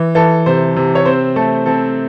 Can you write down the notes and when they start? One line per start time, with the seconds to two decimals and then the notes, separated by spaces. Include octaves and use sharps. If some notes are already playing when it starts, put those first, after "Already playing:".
Already playing: E3
0.15 E3 A4
0.46 C3 C5
0.76 C3
0.95 C#5
1.05 C4 C5
1.36 A3 A4
1.66 C4 A4